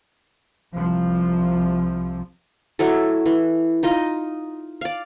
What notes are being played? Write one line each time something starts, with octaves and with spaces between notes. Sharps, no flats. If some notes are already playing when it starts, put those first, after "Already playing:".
C2 C3 F3
F#3 E4 A4
E3
D#4 F4 D#5
D5 F5